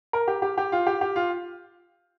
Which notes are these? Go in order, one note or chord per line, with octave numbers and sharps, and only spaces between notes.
A#4
G4
G4
G4
F4
G4
G4
F4